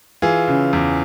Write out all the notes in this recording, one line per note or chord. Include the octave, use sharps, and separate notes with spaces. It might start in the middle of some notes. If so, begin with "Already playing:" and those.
E3 F4 G#4
C#3
E2